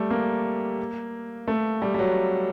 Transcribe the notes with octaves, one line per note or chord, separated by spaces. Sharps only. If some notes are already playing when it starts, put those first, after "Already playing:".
Already playing: G3 A3
A#3
A3
G3
G3
F#3